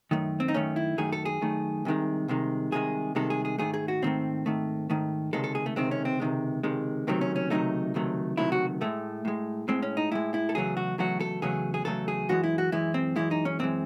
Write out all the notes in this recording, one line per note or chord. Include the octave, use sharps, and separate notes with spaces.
F#2 D#3 A3
C4
D#4
F#2 D#3 A3 C#4
E4
F#2 D#3 A3 G#4
A4
G#4
F#2 D#3 A3
C2 C3 D#3 G#3
C2 C3 D#3 G#3
C2 C3 D#3 G#3 G#4
C2 C3 D#3 G#3 A4
G#4
G#4
G#2 D#3 A3 G#4
G#4
F#4
G#2 D#3 A3 C4
G#2 D#3 A3
G#2 D#3 A3
C#2 C3 D#3 G#3 A4
A4
G#4
A3
C#2 C3 D#3 G#3 C4
C#4
C4
C#2 C3 D#3 G#3
C#2 C3 D#3 G#3
C#2 C3 D#3 F#3 A3 C4
C#4
C#4
C#2 C3 D#3 F#3 A3 D#4
C#2 C3 D#3 F#3 A3
C#2 C3 D#3 F#3 A3 E4
F#4
A2 G#3 A3
A2 G#3
A2 G#3 C4
C#4
D#4
A2 G#3 E4
E4
A4
E2 C#3 F#3 A3 G#4
F#4
E2 C#3 F#3 A3 F#4
A4
E2 C#3 F#3 A3 G#4
G#4
E2 C#3 F#3 A3 A4
G#4
F#2 E3 G#3 F#4
E4
F#4
F#2 E3 G#3 E4
C4
F#2 E3 G#3 E4
D#4
C#4
F#2 E3 G#3 C4